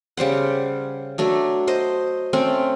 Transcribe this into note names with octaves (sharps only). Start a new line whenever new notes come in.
C#3 G3 C5 F#5
F#3 A3 D4
C5 D#5
A3 C4 C#4